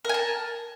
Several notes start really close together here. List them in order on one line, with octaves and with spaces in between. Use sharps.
A#4 G#5 A5